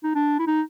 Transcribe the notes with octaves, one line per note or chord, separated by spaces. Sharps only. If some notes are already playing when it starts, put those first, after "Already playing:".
D#4
D4
E4
D#4